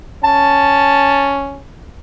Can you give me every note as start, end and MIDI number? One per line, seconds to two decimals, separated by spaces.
0.24 1.62 61
0.24 1.37 81